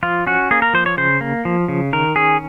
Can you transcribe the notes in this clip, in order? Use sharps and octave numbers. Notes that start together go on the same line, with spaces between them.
F3 F4
C#4 F#4
A#3 G#4
A#4
F3 C5
C#5
C#3 C5
A#3
F3
C#3
D#3 A#4
C#4 G#4